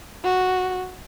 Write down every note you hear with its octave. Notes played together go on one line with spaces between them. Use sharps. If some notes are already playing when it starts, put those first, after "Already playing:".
F#4